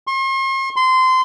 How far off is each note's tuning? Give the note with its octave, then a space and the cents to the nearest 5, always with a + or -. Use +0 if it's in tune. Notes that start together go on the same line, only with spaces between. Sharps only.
C6 +45
C6 -20